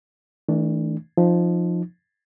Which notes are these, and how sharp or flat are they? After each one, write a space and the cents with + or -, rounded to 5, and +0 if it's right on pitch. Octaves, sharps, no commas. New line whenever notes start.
E3 -40 A3 +0 D4 +0
F3 +0 D#4 -15